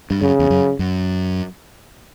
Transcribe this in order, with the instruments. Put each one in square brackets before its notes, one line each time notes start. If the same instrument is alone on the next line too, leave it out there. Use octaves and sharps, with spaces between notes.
[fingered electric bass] G2
[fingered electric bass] F#2 [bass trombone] C#3
[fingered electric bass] E2
F#2
F#2